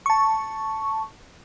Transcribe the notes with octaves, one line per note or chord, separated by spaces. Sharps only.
A5 C#6